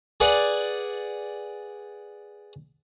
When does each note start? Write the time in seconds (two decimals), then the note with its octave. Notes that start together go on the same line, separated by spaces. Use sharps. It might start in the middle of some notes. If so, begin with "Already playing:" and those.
0.20 G#4 B4 D5 F#5 G#5